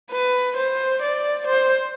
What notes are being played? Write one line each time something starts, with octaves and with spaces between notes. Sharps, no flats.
B4
C5
D5
C5